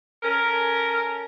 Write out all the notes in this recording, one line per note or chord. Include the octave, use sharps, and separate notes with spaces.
C#4 A4 A#4